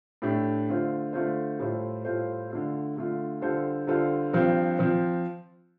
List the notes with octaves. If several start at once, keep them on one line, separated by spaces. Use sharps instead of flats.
A2 A3 D4 G4
D3 A3 F4 C5
D3 A3 F4 C5
A2 G3 F4 A4 C5
A2 G3 F4 A4 C5
D3 A3 F4
D3 A3 F4
D3 G3 F4 A4 C5
D3 G3 F4 A4 C5
G2 F3 C4
F3 C4